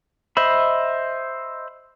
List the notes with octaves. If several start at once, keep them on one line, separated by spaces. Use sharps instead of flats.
C5 D#5 E5 B5